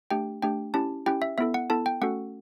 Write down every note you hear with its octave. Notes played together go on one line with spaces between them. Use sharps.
A3 D4 G4 G5
A3 D4 G4 G5
C#4 E4 G4 A5
C#4 E4 G4 G5
E5
B3 E4 A4 E5
F#5
B3 E4 A4 A5
G5
A3 C#4 F#4 A4 F#5